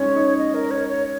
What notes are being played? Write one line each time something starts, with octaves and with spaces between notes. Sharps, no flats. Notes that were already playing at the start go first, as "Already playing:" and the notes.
Already playing: G#3 C#4 D#4 C#5
D#4
D#5
A#4
C#5
C#5